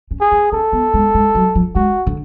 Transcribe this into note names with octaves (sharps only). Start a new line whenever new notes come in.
C#4
G#4
D4
C#4 A4
B3
G#3
G#3
F#3
F3
G#3 F#4
D3